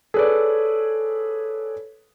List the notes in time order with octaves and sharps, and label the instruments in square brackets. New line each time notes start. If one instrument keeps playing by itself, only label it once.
[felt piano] G#4 B4 D5 [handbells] A4 C#5